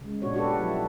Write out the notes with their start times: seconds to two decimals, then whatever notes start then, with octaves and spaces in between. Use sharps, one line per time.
0.01 C#3 G#3
0.22 A#2 D4 F#4 C#5
0.34 D4 F#4 G4 A4 B4
0.59 F3 F#3 E4